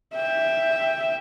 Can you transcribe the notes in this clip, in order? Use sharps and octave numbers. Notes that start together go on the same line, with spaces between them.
E5 G5